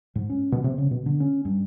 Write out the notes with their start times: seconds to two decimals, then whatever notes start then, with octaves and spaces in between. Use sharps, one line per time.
0.15 G#2
0.29 C#4
0.52 B2
0.64 C3
0.78 C#3
0.91 B2
1.06 D3
1.20 C#4
1.45 G2